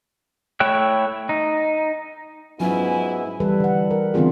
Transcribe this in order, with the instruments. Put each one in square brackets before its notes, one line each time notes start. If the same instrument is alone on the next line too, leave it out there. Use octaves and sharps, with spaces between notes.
[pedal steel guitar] A3 E4 C#5 G5 F#6
D#4
[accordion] G#2 B3 [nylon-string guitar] F#3 C#4 F4 [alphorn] E4 [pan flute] G#5
[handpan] E3 G3 A4 B4
D3 F#5
A#4
D3 E3 B3 C4 F4 G#4